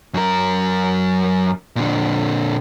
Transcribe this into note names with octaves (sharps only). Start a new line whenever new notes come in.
F#2 A#4
A#2 D3